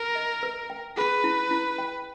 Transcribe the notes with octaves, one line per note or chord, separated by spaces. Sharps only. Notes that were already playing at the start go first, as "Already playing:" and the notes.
Already playing: A#4
D#5
B4
G5
G#4 B4
E4
E4
G5